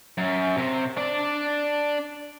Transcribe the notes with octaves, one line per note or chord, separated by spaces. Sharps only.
F#2
C3
D4 D5